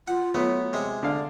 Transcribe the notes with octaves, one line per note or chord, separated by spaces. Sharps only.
F4 F#5
F#3 A3 B3
C3 G#3 G#5
D3 D5 F5